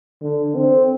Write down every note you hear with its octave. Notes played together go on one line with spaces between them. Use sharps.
D3
C4